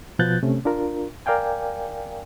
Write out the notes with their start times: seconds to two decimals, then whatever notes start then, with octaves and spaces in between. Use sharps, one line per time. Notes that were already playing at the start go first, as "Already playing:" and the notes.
0.19 B2 F3 B3 F#6 G6 A6
0.43 C3 A3 C#4
0.65 D4 F4 A#4
1.26 A#4 D5 F5 G5 G#5